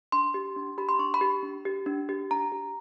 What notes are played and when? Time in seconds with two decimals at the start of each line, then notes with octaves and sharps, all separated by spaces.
0.12 D4 C6
0.34 G4
0.56 D4
0.78 G4 B5
0.89 C6
0.99 D4 C#6
1.14 B5
1.21 G4
1.43 D4
1.65 G4
1.86 D4
2.09 G4
2.31 D4 A#5
2.52 G4